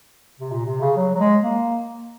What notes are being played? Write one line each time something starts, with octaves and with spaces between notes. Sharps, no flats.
C3
A#2
C3
C#3
F#3
F#3
G#3
A#3